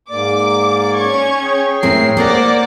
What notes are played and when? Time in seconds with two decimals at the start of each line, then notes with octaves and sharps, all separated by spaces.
0.11 G#2 A#3 D5 D6
0.94 C#4 C#6 G#6
1.44 G#4 C#5 G5
1.83 A2 C4 A#4 C7
2.17 A#3 C4 A#4 C5 D5 F#5